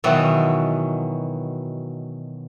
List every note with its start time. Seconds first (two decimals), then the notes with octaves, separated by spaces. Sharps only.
0.04 B2 D#3 E3 F#3